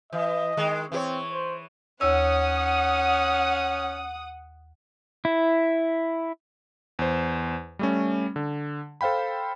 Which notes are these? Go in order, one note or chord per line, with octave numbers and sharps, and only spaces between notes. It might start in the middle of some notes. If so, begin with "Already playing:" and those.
E3 D#5
D#3 G#3
E3 C4 G4 C#5
C5
D#2 C#4 C#5 F#5 D#6 E6
E4
E2 C5
G3 A3 C#4
D3
A4 C5 F5 G5 B5